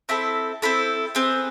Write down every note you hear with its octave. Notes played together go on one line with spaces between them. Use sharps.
C4 E4 A4
C4 E4 A4
C4 G#4 B4